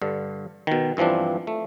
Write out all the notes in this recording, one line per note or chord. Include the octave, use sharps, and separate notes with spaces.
G2 D3
B2 D#3
G2 E3 F3 C4 D4
A3